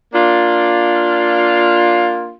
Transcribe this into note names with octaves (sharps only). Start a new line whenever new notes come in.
A#3 D4 F4